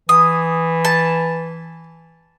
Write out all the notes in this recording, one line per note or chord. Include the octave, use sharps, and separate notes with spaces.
E3 D#6
A5